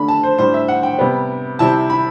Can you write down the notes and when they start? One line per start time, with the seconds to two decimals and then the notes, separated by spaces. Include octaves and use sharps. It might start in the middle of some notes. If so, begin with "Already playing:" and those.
Already playing: D3 A3 D4 B5
0.08 A5
0.23 C5
0.38 A2 G3 D4 C5
0.54 E5
0.68 F#5
0.83 G5
0.99 C3 G3 B3
1.59 C3 G3 C4 E4 A5
1.90 B5